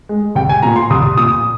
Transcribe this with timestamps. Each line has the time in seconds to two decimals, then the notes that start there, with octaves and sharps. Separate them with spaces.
0.09 G#3
0.35 C2 G5
0.49 G#5
0.62 A#2 F3 A#5
0.76 C6
0.90 C2 D#6
1.17 A#2 F3 D#6